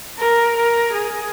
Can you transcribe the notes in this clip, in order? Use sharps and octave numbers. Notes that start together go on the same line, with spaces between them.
A#4
A#4
G#4